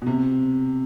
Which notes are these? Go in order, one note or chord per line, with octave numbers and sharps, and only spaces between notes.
B2
C3